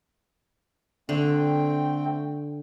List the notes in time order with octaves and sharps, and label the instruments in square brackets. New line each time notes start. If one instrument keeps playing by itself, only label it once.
[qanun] D3 [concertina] A3 C4 G5